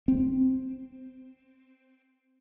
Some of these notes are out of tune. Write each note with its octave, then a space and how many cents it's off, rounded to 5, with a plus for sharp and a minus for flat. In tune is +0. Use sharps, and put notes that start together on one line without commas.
C4 +0